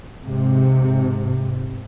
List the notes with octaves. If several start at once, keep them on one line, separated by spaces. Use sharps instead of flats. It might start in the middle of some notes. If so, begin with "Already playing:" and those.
G#2 C3